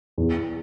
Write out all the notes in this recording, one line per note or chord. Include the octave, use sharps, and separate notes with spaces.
E2